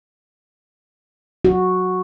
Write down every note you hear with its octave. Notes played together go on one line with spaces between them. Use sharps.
F#4